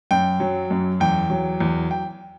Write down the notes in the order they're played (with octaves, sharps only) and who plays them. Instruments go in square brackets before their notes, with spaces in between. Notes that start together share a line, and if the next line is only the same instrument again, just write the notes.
[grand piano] F#2 G5
F#3
F#2
E2 G5
F#3
E2
G5